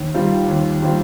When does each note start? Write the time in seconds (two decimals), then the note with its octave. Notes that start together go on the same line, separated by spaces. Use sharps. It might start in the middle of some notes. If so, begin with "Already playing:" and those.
Already playing: D#2
0.14 D#3 G3 C4 F4
0.48 D#2
0.82 D#3 G3 C4 F4